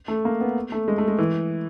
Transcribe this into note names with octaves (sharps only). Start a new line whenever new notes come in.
A3
A#3
B3
A3
G#3
A3
G#3
E3